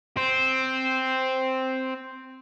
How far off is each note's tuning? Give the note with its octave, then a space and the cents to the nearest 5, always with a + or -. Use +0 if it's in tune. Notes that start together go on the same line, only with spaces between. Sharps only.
C4 +0 C5 +0